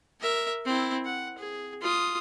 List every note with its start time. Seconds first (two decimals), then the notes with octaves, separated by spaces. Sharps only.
0.20 A#4 E5
0.65 C4 E4
1.05 F#5
1.38 G#4
1.81 F4 D#6